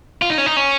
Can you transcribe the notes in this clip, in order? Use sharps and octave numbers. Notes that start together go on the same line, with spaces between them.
F4
D#4
C#4
D#4
C#4